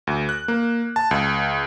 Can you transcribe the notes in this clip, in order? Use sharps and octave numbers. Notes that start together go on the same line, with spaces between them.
D2
F#6
A#3
A5
C#2